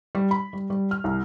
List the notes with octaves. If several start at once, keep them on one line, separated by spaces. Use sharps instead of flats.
G3
B5
G3
G3
F6
C2